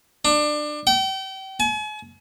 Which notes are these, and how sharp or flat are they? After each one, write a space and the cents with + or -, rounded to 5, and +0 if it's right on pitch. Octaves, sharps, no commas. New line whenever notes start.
D4 +25
G5 -35
G#5 +40